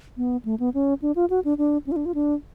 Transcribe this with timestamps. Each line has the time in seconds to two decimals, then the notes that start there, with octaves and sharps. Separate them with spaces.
0.17 B3
0.45 A3
0.60 B3
0.74 C#4
1.02 D4
1.16 F4
1.30 F#4
1.45 D4
1.58 D4
1.87 C#4
1.92 F4
1.96 D4
2.06 F4
2.15 D4